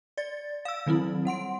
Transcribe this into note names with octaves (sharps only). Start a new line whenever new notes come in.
D5 A6
F5 E6
D#3 F#3 C4 E4
G3 F#5 C6 D7